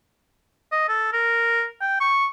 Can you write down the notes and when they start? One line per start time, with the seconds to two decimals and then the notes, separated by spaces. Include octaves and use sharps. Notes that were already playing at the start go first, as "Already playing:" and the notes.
0.72 D#5
0.89 A4
1.13 A#4
1.81 G5
2.01 C#6